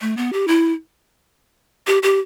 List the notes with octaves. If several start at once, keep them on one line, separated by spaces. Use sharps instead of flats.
A3
B3
G4
E4
G4
G4